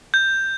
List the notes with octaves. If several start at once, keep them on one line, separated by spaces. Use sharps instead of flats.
G6